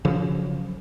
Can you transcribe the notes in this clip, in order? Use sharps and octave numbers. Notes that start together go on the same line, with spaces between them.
C#3 F3 F#3